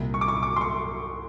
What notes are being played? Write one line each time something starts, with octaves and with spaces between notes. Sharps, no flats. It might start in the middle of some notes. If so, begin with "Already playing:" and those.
Already playing: C2 A#2
C#6
D6
C#6
D6
C6
C#6